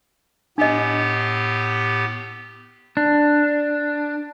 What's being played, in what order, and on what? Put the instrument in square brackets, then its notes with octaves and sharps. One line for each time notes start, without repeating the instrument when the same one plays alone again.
[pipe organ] A2 B3 G4 [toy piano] D4 D#5
[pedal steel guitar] D4